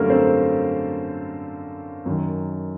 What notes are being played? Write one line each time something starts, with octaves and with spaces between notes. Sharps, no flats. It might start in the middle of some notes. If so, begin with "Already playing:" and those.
Already playing: F#2 D3 G3 A3 A#3 A4 A#4
C4 C5
F#2 D#3